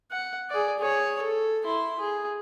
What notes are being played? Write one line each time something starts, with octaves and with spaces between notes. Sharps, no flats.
F#5
G#4 D5
G#4 C#5
A4
E4 C6
G#4